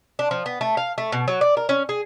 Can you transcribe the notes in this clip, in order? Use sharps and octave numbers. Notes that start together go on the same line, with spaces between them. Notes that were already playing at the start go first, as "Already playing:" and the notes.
D4
F3
B3
A3
F5
A3
B2
F#3
D5
A#4
C#4
G#4